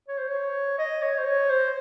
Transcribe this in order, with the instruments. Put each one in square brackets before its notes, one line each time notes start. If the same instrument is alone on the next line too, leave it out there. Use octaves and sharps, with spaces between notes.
[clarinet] C#5
C5
C#5
D#5
C#5
C5
C#5
C5